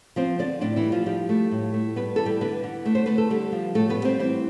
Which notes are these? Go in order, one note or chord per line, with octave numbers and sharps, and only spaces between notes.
F3 C4 C5
D3 D4 D5
A2 D4 D5
E3 E4
G3
F3 F4
F3 G3 G4
A3
A2
A3
G3 B3 B4
E3 A4
G3 G4
D3 B3 B4
D3
A3
C5
A3 B4
A4
D3 G3 G4
F3
A2 A3 A4
B3 B4
G3
C4 C5
E3 C4 C5